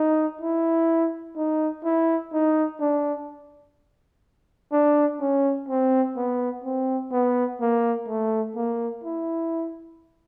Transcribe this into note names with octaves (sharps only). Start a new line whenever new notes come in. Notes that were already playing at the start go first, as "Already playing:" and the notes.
Already playing: D#4
E4
D#4
E4
D#4
D4
D4
C#4
C4
B3
C4
B3
A#3
A3
A#3
E4